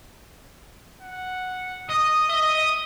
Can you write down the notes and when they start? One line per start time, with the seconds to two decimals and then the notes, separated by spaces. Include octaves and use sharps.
1.02 F#5
1.89 D#5 D#6
2.30 E5 D#6